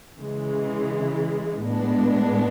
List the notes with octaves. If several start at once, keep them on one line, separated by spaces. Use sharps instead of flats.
C#3 E3 G#3
A2 G#3 B3 D4